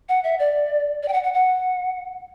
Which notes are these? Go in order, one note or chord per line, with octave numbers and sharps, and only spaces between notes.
F#5
E5
D5
D5
G5
F#5
F#5
F#5